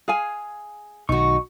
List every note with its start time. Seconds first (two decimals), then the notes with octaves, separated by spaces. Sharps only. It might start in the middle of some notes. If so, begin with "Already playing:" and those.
0.08 G#4 F5 G#5
1.09 B1 D#3 D#4 F#4 C#6